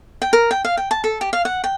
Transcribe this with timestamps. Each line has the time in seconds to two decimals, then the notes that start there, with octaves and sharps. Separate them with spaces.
0.22 G5
0.33 A#4
0.51 G5
0.65 F5
0.77 G5
0.91 A5
1.04 A4
1.21 G4
1.33 F5
1.45 F#5
1.64 G5